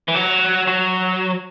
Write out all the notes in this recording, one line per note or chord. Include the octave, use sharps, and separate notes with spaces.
E3
F#3
F#3